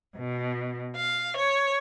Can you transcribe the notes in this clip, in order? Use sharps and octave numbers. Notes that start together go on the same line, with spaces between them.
B2
F5
C#5